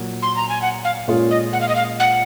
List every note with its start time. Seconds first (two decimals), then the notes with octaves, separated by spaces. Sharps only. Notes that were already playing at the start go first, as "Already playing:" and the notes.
Already playing: A#2 F#3
0.22 C6
0.36 A#5
0.49 G#5
0.62 F#5
0.84 F5
1.08 A#2 G#3 C#4 F4 G#4
1.31 D#5
1.53 F#5
1.61 F5
1.69 D#5
1.76 F5
2.00 F#5